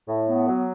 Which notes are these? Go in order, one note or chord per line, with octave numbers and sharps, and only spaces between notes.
A2
B3
F#3